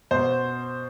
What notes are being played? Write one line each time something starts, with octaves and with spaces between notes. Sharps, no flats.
B2 C5